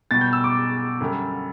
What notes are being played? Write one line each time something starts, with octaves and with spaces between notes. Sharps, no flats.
B2 G3 A6
G6
E6
D6
F#2 D3 G3